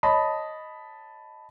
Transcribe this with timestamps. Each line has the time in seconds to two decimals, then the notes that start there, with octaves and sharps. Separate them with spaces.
0.03 C#5 D#5 A5 B5